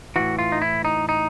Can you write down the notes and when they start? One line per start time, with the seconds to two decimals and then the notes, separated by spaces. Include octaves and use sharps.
0.16 A2 E3 F#4
0.39 F4
0.52 D#4
0.62 E4
0.85 D#4
1.09 D#4